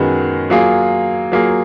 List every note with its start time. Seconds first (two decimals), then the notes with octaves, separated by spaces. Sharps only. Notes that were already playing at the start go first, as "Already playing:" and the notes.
Already playing: F#2 D#3 G#3 B3 F#4
0.50 F#3 A#3 F4 G#4
1.32 F#3 A#3 F4 G#4